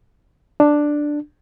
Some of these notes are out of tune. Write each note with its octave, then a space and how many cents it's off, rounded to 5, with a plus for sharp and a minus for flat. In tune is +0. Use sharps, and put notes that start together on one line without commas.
D4 +5